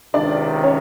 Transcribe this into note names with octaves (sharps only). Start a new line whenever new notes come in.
C#2 C3 D#3 D4 D5
C#4 C#5